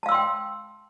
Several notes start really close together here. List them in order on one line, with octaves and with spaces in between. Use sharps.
A5 F5 E6 C6 G5